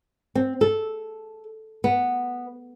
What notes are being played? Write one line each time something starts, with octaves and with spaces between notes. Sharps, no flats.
C4
A4
B3